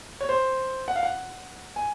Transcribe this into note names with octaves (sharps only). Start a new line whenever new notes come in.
C#5
C5
F#5
F5
F#5
G#5